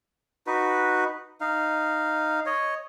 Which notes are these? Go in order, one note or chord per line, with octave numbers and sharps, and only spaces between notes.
D#4 F#4 B4
D#4 F5
C#5 D#5